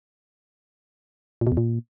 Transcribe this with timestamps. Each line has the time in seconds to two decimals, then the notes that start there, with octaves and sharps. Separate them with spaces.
1.41 A#2
1.47 B2
1.52 E2
1.57 A#2